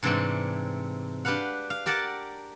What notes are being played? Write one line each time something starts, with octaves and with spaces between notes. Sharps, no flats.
G#2 C3 E3 A3 C4 D4
D4 G4 B4 F5 F#5
F5
G4 A#4 D5 F#5 A5